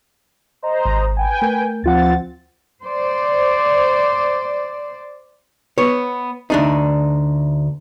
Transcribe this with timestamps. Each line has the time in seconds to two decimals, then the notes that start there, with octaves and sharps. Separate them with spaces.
0.63 C5 D#5 A#5
0.86 G#1
1.17 B4 G5 G#5
1.42 A3 A#4 G6
1.84 D2 F3 C4 F4 F#5 A6
2.83 C5 D5
5.78 B3 C#5
6.50 D2 D4 D#4